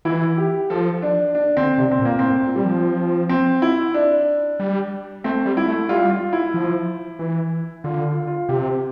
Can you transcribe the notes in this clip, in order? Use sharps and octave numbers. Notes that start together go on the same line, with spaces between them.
E3 E4
G4
F3 A4
D4
D4
D3 C4
C3 D4
C4
A#2
A#3
A2 C4
A#2
G3
F3
C4
E4
D4
G3
A3 C4
G3
E4
A3
G3 F4
F4
E4
F3
E3
D3 F4
F4
F4
C3 G4